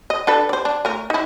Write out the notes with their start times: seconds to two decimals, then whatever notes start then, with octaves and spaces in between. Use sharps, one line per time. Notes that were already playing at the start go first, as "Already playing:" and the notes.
0.10 D#5
0.27 D4 A4 B4
0.49 C5 D5
0.65 D4
0.85 A3 A#4
1.10 D#4 E4